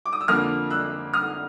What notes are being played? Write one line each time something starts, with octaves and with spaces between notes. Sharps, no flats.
D6
D#6
E6
F2 D3 F3 A#3 D#6 F6
E6 F#6
D#6 F6